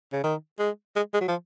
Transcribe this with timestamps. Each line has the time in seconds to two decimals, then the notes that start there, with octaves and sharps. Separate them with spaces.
0.12 C#3
0.23 D#3
0.59 G#3
0.96 G#3
1.14 G#3
1.21 F#3
1.28 F3